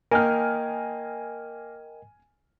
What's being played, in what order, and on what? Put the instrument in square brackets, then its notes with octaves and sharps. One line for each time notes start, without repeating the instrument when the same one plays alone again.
[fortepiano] A#3 [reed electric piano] A#4 D#5 G5 [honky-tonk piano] G#5 F6